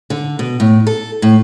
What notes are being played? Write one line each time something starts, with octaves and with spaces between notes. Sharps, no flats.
D3
B2
A2
A4
A2